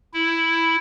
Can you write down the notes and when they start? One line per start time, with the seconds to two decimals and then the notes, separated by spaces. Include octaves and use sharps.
0.14 E4